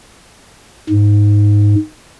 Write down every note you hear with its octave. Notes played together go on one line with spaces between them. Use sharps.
G#2